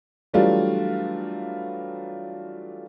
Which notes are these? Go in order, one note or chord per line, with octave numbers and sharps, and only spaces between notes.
E3 F#3 G3 A3 D4 F4